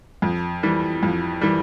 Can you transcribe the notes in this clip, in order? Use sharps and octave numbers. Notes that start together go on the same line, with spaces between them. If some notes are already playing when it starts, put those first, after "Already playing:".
F2
E3 G3
F2
E3 G3